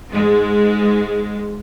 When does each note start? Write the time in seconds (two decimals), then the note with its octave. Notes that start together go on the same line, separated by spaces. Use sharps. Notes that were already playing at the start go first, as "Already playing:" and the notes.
0.12 G#2 G#3